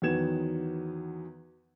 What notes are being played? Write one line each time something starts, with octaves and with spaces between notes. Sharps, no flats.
E2 D#3 F#3 B3 G#6 E7